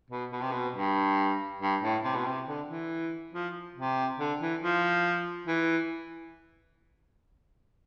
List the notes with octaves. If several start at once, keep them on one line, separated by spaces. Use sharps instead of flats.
B2
B2
C3
B2
G2
G2
A2
C3
B2
C3
D3
E3
F3
C3
D3
E3
F3
E3